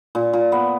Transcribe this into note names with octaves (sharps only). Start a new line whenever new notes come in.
A#2
A#2
B3